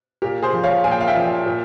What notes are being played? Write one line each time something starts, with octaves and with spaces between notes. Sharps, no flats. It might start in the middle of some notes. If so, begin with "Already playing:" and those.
A#2 G4 A#4
G#4 C5
F3
C#5 F5
A#2 G#5
G5
F5
E5 G5
F3
A#2